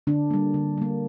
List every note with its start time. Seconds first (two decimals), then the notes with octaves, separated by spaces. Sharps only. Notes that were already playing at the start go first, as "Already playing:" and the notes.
0.07 D3 D4
0.31 G3 A#3
0.54 D3
0.78 G3 A#3